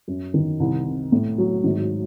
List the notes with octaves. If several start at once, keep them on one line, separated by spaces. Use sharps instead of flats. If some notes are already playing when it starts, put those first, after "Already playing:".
F#2
D#3
C2
C3
A2
F#3
G#1